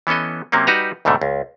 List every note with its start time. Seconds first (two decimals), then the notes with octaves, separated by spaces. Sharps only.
0.07 E3 B3 C#4 A4 D#5
0.52 C3 F#3 A#3 C4 C#4
0.67 G3 D#4 F#4 B4 A#5
1.05 D2 G#2 B2 D3 A3
1.22 C#2